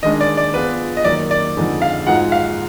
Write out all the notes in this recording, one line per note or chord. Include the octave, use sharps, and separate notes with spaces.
D#3 G#3 D4 D#5
D5
D5
F3 B3 F4 G#4 B4
D#5
F#2 D#3 A#3 D5
D5
F2 D3 G#3 D#4 G#4
F5
G#2 F3 G#3 D#4 F#4 F#5
F5